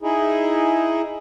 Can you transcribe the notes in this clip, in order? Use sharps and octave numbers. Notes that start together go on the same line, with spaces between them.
D#4 E4 G#4